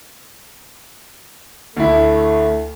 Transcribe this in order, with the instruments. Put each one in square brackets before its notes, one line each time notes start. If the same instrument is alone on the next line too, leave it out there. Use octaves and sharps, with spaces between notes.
[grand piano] D2 E4 [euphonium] A3